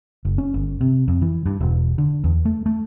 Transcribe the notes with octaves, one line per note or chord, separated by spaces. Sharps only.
F#1
C#4
G1
C3
F2
E3
G2
E1
D3
E2
A3
A3